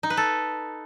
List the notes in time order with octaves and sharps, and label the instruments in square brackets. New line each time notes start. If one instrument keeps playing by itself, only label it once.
[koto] D#4
B4
A4